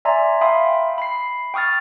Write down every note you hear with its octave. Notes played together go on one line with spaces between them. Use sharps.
D5 E5 G#5 A#5 C6
E5 F5 G5 B5 C6 D#6
B5 C7
G5 C#6 D#6 F6 A6